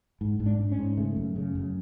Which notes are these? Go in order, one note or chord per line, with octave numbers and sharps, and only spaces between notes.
G#2
G#2
D4
G#2
C#4
G#2
C#3 A3
F#2
C#3
F#2